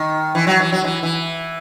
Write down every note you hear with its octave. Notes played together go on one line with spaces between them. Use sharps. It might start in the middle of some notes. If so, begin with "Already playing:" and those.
Already playing: D#3
E3
F#3
E3
F#3
E3
E3